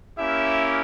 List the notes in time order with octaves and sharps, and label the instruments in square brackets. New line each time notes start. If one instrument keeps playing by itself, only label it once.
[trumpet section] A#3 C#4 E4 G4 E5